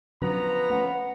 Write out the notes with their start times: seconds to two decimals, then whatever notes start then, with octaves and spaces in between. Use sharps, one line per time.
0.22 D3 F3 F#3 B3 C#4 B4 A#5
0.70 A3 C#4 F#5